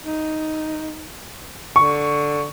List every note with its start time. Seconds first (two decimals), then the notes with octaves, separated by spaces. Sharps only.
0.04 D#4
1.76 D3 C#6